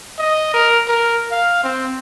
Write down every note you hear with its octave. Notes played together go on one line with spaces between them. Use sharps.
D#5
A#4
A#4
F5
C4